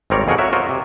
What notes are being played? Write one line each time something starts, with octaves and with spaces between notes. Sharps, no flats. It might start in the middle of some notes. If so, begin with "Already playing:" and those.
G#1 G3 C4 A#4 C#5 D5
F2 B2 G#4 A#4 C#5 F#5
F#4 A#4 C#5 E5
F4 F#4 A#4 C5 C#5 D#5
C3